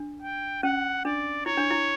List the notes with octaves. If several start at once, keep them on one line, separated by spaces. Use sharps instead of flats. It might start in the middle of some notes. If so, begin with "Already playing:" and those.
Already playing: D4
G5
C#4 F#5
D4 D5
E4 C#5
D4
E4